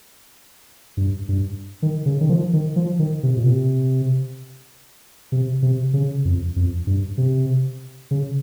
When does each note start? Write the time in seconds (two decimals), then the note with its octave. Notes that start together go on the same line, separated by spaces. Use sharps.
0.97 G2
1.29 G2
1.82 D#3
2.06 C#3
2.21 D#3
2.29 F3
2.53 D#3
2.76 F3
2.99 D#3
3.23 C3
3.37 A#2
3.46 C3
5.32 C3
5.62 C3
5.93 C#3
6.25 F2
6.56 F2
6.87 G2
7.18 C3
8.11 C#3